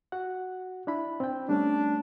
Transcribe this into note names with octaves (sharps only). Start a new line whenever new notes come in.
F#4 F#5
D4 E4 B5
C4 G5
G3 A3 C#4 D4